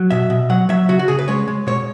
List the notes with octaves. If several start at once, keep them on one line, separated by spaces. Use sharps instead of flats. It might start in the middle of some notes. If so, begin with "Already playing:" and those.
Already playing: F#3
B2 E5
B2
F#3 F#5
F#3 E5
C#3 F#4
F#4
C#3 G#4
B4
G#3 C#5
G#3
B2 C#5